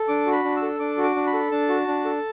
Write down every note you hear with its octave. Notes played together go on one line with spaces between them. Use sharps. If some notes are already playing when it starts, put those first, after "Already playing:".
Already playing: A4
D4 D6
F#4
B5
D4
E6
A4
D4 D6
F#4
D6
D4
B5
A4
D4 A5
F#4
D4
A4